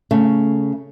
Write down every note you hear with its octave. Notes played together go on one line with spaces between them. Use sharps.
C#3 A3